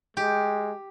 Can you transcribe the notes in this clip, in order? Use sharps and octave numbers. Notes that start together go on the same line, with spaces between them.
G#3 G4